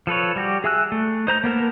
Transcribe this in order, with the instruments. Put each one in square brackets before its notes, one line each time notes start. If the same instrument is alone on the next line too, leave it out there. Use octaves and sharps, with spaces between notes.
[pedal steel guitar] F3 A4 B4 C#5
G3 F#4 G4
G#4 E5 G#5 E6 F#6
A3
D#4 C5 A#5 G6
A#3 B3 A#4 A5